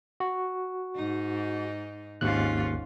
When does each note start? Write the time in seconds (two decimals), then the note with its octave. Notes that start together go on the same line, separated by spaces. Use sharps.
0.20 F#4
0.96 G#2 D#4
2.21 G#1 D#2 G#2 C#4 F4 F#6